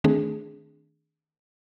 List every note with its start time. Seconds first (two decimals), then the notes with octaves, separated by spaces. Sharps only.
0.04 D#3 A3 C4 D4 G#4